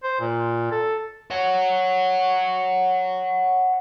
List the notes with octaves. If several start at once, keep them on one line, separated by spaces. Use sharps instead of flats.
C5
A#2
A4
C#5 F#5